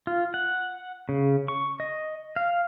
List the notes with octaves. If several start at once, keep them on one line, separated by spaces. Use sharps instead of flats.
F4
F#5
C#3
C#6
D#5
F5